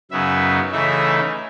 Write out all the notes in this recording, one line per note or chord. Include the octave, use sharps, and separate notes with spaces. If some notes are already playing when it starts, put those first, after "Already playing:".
F#2 C#3 F#3 B3 D#4 E5
C#3 E3 A3 D#4 E5